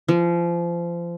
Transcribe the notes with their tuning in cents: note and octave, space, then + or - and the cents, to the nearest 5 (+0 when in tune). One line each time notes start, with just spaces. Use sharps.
F3 -30